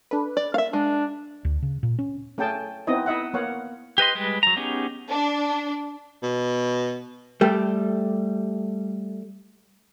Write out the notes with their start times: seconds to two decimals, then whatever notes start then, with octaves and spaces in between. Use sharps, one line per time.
0.11 D4 A4 B4
0.37 D5
0.54 A#3 E5 F5
0.73 G#3 D4
1.45 D2
1.62 C#3
1.83 A#2
1.99 C#4
2.38 A3 C#4 G#4 G5 A5
2.87 B3 C4 D#4 E4 D#5
3.06 E4 D#5 E5 F#5
3.34 A#3 B3 C#5 F5 F#5
3.98 G4 B4 D#5 C6
4.15 G3 G#3 B4
4.43 F#3 A#5
4.57 B3 C#4 D#4 G4 G#4
5.10 D4
6.23 B2
7.41 G3 A3 G4